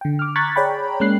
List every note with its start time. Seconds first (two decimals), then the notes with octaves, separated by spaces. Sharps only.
0.01 D3 G5
0.19 D6 F6
0.36 A#5 C#6 F#6 G#6 A6 B6
0.56 G#4 C#5 D5 G5 A#5 B5
1.00 G#3 A#3 C#4 F#6 C7